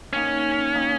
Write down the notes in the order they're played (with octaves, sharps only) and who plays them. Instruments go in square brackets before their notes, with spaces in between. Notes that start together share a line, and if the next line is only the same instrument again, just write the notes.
[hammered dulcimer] D#3 A#3 D#4 [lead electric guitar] C#4
[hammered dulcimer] D#3 A#3 D#4